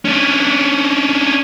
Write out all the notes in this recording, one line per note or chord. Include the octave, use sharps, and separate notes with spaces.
C#4 D4